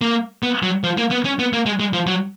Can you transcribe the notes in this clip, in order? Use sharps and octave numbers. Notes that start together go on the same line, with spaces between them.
A#3
B3
F#3
F3
A#3
B3
C#4
B3
A#3
G#3
G#3
F3
F#3